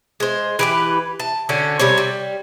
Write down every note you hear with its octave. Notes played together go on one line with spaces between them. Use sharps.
G#3 C5
E3 G4 B4
A5
D3 C#4 F#4
C3 G3 C5 C#5
G3